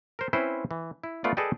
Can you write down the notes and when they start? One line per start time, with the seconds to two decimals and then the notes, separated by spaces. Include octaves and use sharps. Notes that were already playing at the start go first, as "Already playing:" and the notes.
0.19 A#4 C5
0.33 C4 C#4 E4 B4 C5
0.71 E3
1.04 E4
1.24 A3 B3 F4 D5
1.37 G#4 A4 B4 D5 D#5 G5